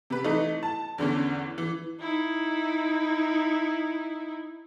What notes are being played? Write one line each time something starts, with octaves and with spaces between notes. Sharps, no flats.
C3 B4
E3 A3 D#4
A5
E2 D3 E3 C#4
E3
D#4 E4